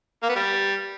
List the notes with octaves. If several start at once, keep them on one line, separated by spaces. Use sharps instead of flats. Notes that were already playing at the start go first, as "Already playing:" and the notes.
A#3
B3
G3